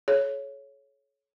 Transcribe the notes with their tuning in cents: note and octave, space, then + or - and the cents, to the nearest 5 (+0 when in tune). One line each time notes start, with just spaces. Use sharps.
A4 -45 C#5 +0